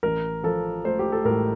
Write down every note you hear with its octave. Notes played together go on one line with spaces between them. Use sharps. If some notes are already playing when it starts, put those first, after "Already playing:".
A1 A#4
F3 A4
A3 C5
G4
A4
A2 A#4